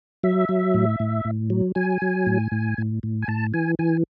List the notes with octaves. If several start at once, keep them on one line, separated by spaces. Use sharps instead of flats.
F#3 E5
F#3
A2
A2
A2
F#3
F#3 G#5
F#3
A2
A2
A2
A2
G#5
A2 A5
E3 G#5
E3 G#5